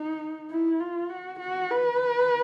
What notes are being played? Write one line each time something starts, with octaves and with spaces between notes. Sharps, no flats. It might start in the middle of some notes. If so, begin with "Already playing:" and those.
Already playing: D#4
E4
F4
F#4
F#4
B4